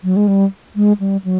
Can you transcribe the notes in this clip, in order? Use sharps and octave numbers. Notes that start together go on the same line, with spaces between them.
F#3
G#3
G3
G#3
G3
F#3